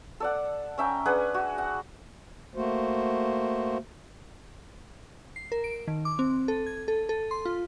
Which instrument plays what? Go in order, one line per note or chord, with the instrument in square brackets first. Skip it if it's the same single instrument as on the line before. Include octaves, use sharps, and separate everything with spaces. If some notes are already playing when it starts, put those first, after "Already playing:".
[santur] A4 D5 F#5
C#4 E5 G5 A#5
D4 G#4 B4 F#5
F#4
F#5
[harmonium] A3 A#3 F#4 C5
[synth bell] C7
A#4
D7
D#3
D6
C4
A4
G#6
A4
A4
C6
F4